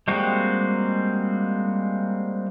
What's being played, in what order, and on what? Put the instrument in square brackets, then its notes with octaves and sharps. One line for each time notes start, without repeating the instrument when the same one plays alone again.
[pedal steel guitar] G3 G#3 A#3 C4 F#4